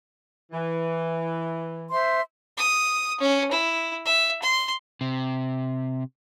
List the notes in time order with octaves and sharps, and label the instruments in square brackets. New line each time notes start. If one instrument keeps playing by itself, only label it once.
[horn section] E3
[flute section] C5 E5 C6
[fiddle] D#6
C#4
E4
E5
C6
[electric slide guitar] C3